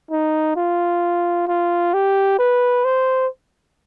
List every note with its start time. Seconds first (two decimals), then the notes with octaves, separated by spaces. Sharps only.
0.11 D#4
0.56 F4
1.48 F4
1.94 G4
2.39 B4
2.85 C5